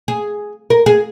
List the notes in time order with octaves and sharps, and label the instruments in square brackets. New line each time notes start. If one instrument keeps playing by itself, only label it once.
[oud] G#4
A#4
G#4